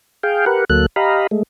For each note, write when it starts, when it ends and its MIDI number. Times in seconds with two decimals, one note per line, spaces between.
0.23 0.45 68
0.23 0.45 77
0.23 0.45 79
0.46 0.65 67
0.46 0.65 70
0.46 0.65 71
0.46 0.65 78
0.70 0.86 38
0.70 0.86 54
0.70 0.86 58
0.70 0.86 69
0.70 0.86 90
0.96 1.27 67
0.96 1.27 75
0.96 1.27 77
0.96 1.27 82
0.96 1.27 83
1.31 1.43 56
1.31 1.43 57